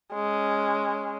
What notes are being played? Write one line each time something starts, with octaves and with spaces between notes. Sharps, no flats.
G#3 C#4